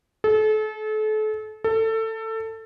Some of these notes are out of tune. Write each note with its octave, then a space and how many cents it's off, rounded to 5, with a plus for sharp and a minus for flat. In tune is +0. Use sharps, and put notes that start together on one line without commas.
A4 -35
A4 +20